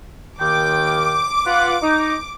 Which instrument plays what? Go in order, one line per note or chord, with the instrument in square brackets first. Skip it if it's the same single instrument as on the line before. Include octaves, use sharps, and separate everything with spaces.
[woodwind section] D#2 D#3 G5 [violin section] D6
[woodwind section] F4 B4 F#5
D#4